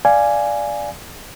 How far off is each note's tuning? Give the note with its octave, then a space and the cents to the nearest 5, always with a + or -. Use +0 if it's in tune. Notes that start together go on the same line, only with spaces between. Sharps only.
D5 +0 F5 -15 G#5 +0